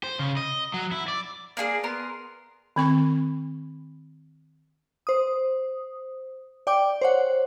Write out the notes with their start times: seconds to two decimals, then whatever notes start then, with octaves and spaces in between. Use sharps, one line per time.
0.04 C5
0.19 C#3
0.37 D#5
0.74 F#3
0.92 E4
1.08 D5
1.57 A#3 D4 F#4 G#4
1.84 B3 A#4 C6
2.76 D#3 C4 C#6
5.07 C5 D#6
6.67 D5 G5 D6
7.01 C5 C#5 F#5